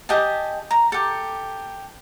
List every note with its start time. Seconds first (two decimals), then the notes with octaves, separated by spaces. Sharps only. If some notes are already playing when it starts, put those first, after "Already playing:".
0.09 G4 D#5 G#5 A5
0.71 A#5
0.92 G4 A4